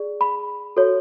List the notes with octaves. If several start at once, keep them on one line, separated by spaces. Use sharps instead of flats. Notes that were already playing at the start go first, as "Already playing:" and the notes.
Already playing: G#4 D5
B5
F#4 A4 C#5